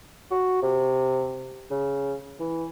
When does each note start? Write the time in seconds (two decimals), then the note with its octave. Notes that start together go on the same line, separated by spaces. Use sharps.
0.31 F#4
0.63 C3
1.71 C#3
2.40 E3